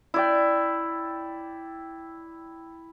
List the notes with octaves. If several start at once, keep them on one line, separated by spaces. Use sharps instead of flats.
E4 D5 G5